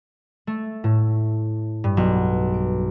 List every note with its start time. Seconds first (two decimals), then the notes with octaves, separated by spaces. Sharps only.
0.47 A3
0.84 A2
1.84 G2
1.97 B1
2.54 D7